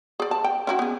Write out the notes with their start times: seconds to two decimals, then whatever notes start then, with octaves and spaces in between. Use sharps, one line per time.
0.20 G#4 D5
0.31 A5
0.44 G5
0.67 C#4 E4 F#4
0.79 B3 G#4